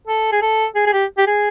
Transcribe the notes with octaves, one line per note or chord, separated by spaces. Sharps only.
A4
G#4
A4
G#4
G#4
G4
G4
G#4